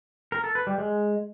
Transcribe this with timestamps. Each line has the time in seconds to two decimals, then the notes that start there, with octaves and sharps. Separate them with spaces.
0.32 A#4
0.44 A4
0.55 B4
0.67 G3
0.78 G#3